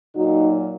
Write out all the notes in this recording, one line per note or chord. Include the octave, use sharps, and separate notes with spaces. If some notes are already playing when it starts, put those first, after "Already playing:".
A#2 F#3 D#4 F#4